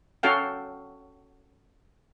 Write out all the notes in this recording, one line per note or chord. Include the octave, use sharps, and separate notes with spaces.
C#4 F#4 A4 F5 G5